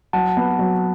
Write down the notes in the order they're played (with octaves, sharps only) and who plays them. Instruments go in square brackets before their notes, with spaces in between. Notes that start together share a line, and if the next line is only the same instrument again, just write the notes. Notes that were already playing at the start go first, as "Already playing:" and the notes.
[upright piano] F#3 [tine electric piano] F#5 A5
[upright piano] B3
F#3